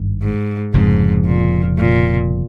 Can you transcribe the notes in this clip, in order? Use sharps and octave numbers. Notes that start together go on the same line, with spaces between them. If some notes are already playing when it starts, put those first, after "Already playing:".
Already playing: G#1 G2 D#3
G#2
F1 F2 G#2 C#3 F3
A#2
A#2